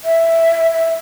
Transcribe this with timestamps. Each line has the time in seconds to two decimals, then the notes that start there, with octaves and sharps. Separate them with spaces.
0.05 E5
0.74 E5